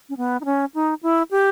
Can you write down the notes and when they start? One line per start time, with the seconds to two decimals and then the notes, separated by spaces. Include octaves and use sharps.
0.09 C#4
0.17 B3
0.41 D#4
0.45 C#4
0.74 D#4
1.03 E4
1.31 G4